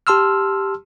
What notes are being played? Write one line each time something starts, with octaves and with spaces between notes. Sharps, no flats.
G4 A5 C6 E6 F6